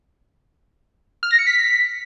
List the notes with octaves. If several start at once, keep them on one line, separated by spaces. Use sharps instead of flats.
F6
A#6
C#7
B6